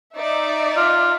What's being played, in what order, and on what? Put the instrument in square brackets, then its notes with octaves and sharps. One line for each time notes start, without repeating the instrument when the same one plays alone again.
[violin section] D#4 D5 E5
[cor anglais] F4